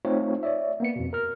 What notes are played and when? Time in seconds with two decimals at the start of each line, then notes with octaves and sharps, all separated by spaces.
0.05 A3 C4 D#4 F4 C5 C#5
0.43 C#5 D5 E5
0.80 A#3 B3 C#7
0.96 F2 B2
1.13 A#4 F6